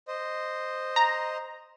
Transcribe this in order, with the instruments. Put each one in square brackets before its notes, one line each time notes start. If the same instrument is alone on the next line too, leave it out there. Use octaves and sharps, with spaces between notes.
[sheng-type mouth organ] C5 D#5
[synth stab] A#5